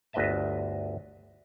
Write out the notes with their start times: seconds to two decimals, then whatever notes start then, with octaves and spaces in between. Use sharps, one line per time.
0.13 G1 D2 B4 D#5 E5 A5